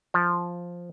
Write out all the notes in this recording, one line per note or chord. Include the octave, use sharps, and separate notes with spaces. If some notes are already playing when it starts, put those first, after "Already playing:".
F3